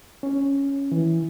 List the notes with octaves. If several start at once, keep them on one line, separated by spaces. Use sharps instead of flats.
C#4
E3